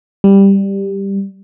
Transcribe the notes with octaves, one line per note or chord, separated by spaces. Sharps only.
G3